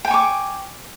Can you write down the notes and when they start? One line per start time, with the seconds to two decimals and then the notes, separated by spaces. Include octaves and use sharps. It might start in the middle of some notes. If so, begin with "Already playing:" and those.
0.05 G5
0.08 G#5
0.11 C#6
0.14 D6